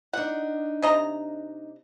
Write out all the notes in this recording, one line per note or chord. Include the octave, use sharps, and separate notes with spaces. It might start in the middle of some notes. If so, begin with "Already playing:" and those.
D4 D#4 F#5
C3 D#5 A#5